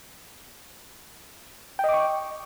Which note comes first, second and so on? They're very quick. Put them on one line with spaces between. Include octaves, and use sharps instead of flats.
G5 D#5 D6 C#6